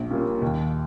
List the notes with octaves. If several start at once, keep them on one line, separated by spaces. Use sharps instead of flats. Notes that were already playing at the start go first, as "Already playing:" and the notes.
Already playing: A#1
A#2 G3 A#3 C#4
D#2